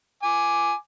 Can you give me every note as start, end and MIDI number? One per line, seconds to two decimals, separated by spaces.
0.23 0.74 80
0.23 0.74 86